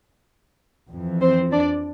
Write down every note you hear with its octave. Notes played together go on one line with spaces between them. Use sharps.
F2 E3
C4 C5
D4 D5